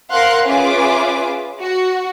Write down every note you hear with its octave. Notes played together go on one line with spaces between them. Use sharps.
A#4 C5 F5 F#5 C6 F#6
C#4 F4 G#4 B4 E5 D6
F#4